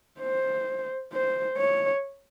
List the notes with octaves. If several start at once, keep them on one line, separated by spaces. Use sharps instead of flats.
C5
C5
C#5